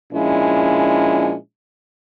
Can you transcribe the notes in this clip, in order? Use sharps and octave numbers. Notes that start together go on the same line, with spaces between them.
A#2 F3 G#3 C#4 D4 E4